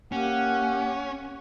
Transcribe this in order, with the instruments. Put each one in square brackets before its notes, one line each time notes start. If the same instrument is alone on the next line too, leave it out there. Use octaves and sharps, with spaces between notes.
[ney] A#3 [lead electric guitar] C#4 [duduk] G4 [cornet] F#5